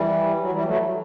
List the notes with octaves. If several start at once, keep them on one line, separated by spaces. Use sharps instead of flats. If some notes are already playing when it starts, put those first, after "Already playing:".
Already playing: E3 G3
F#3
E3 G3
F#3 A3